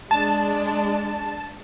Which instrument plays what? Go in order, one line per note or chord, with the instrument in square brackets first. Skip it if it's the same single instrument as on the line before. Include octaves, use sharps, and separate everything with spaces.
[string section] G#3 D4 [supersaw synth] A5